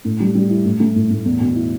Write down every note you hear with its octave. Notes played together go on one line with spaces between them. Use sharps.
A2
G3
G3
E4
A2
A3
A2
A2
E2
B2
E4